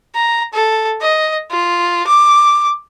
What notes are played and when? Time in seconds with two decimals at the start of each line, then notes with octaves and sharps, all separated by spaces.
0.15 A#5
0.54 A4
1.01 D#5
1.51 F4
2.07 D6